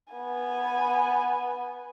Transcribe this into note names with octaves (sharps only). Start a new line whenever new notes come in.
B3 G#5